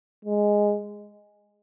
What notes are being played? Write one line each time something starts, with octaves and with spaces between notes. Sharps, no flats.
G#3